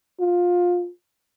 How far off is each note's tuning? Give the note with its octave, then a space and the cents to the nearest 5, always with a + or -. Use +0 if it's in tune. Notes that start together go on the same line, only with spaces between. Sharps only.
F4 +20